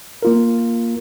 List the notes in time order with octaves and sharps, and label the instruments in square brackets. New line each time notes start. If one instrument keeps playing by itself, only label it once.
[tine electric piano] A#3 F4 A#4